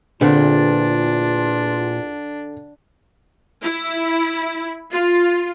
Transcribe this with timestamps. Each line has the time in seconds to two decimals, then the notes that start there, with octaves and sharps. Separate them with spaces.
0.21 E2 A#2 D3 B3 C4 D4 F4
3.63 E4
4.92 F4